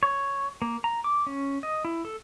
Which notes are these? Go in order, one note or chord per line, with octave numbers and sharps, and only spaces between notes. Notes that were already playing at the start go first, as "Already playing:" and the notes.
C#5
A#3
A#5
D6
C#4
D#5
E4
A4